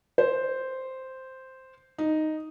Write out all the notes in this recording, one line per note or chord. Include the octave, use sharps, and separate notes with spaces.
C5
D#4